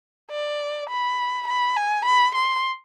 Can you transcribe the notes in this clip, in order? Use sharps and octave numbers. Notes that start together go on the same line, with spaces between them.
D5
B5
B5
G#5
B5
C6